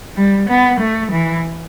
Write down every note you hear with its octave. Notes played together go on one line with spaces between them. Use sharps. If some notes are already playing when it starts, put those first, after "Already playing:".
G3
B3
A3
E3